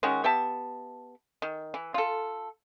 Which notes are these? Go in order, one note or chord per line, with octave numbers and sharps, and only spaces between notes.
D#3 G#3 C#4 F#4
B3 G4 E5 A5
D#3
E3
F4 A4